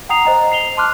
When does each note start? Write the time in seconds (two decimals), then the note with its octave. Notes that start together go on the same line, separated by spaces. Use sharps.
0.09 F#5 G5 A#5 D#6 C7 F7
0.25 C5 D#5 A#5
0.52 C7 F7 G7
0.77 A5 C6 D6 F6 F#6